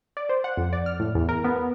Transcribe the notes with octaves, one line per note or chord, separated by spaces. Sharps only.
D5
C5
F#5
F2
D5
F6
A2
E2
A#4
B3
B3